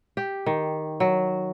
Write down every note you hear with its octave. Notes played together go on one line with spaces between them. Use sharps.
G4
D#3
F#3